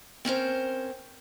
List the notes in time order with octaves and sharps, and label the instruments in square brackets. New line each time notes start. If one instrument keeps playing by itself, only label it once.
[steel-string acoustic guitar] C4 C#4 A#4 C5